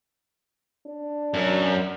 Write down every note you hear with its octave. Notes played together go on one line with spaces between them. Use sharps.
D4
F#2